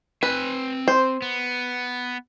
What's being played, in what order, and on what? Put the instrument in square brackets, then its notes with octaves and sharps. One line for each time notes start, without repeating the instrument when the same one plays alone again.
[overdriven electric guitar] C4 G#5 [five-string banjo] B4
[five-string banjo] C5
[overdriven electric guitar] B3